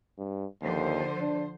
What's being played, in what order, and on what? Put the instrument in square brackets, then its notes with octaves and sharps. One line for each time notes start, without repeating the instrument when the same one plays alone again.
[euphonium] G2
[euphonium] D#2 [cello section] D3 F3 C5
[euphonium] D4